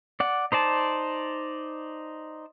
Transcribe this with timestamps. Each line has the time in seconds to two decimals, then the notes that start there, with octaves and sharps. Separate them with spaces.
0.20 D5 F#5
0.52 D#4 C5 D5 A5